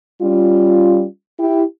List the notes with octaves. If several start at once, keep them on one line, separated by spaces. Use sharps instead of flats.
G3 C#4 F4
E4 G4